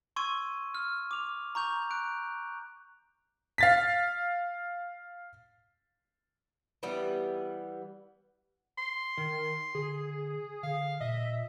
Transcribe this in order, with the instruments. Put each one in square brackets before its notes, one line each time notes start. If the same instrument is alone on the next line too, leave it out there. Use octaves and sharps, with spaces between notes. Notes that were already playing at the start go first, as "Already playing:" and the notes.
[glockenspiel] C6 C#6 E6 G#6 D#7
F6
D6 F7
A#5 C#6 G6 F7
F#6 D7
[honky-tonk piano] F5 A6 B6
[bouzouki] E3 G3 B3
[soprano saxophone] C6
[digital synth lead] D#3
[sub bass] D3 [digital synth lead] G#4
[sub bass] D3 [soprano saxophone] F5
[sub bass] A#2 [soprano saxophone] D#5 [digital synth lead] E5